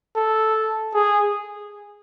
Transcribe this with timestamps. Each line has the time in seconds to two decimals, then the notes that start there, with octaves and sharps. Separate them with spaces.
0.15 A4
0.94 G#4